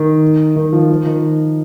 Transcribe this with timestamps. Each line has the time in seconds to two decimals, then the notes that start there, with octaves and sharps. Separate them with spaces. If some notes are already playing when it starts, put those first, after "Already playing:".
Already playing: D#3
0.56 D#3
0.73 F3
0.90 F3
1.06 D#3